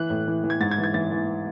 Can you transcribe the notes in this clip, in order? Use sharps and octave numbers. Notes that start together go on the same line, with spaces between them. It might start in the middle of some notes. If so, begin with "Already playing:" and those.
Already playing: E3 F#6
A2
E3
E3
G#6
G#2 A6
G#6
E3
G#6
E3 A6
E3